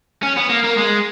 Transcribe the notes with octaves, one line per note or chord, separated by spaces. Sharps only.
C#4
B3
A#3
A#3
G#3